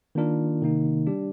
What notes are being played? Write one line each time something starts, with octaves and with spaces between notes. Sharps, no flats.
D#3 A#3 D4 F4 A#4
C3 D#3 A#3 D#4
G3 D4 G4 D5